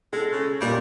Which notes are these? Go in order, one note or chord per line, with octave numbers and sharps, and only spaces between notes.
G#3 A4
C#3
F2 A#2 G3